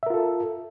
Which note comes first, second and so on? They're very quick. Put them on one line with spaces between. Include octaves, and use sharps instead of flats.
E5 A#4 F4 A4